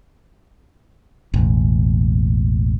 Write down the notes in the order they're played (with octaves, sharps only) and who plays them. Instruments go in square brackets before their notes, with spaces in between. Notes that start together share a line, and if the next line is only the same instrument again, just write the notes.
[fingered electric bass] E1 A1